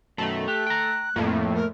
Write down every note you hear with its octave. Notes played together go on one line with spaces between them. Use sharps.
F#2 B2 D#3 A3
G4 F#6
G5 A#5
F2 A2 A3 A#3
A#4